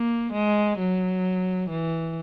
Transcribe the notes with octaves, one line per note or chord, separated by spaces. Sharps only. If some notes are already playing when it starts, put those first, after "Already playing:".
Already playing: A#3
G#3
F#3
E3